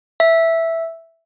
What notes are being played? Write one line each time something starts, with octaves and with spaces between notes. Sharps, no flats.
E5